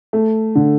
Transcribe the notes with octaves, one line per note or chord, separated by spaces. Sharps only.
A3
D3